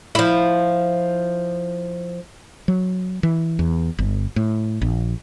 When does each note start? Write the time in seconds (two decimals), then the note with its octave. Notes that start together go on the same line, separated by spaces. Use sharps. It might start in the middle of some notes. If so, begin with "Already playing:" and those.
0.15 F3 E4
2.68 F#3
3.23 E3
3.59 E2
3.99 G1
4.36 A2
4.82 A#1